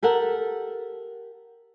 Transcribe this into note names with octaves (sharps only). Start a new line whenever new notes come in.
G4 A4 A#4 F#5